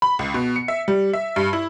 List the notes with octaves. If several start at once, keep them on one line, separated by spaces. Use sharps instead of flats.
B5
C#2
B2
C#7
E5
G3
E5
G2
E4